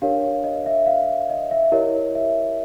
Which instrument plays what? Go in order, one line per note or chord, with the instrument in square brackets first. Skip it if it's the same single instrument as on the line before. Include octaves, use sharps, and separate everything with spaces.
[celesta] D4 G4 A#4 C#5 F5
D#5
E5
F5
D#5
E5
E4 G4 A#4 C#5 D#5
E5